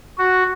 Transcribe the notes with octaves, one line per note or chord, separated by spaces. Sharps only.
F#4